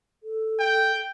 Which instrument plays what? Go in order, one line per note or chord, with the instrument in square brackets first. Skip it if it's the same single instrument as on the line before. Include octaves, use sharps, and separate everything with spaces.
[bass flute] A4
[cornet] G5